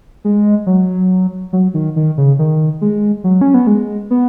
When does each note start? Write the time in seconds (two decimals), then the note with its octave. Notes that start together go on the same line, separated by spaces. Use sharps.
0.25 G#3
0.67 F#3
1.53 F#3
1.74 D#3
1.96 D#3
2.18 C#3
2.39 D#3
2.81 G#3
3.24 F#3
3.41 C#4
3.54 B3
3.67 G#3
4.10 B3